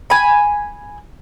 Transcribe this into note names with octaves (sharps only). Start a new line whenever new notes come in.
G#5 B5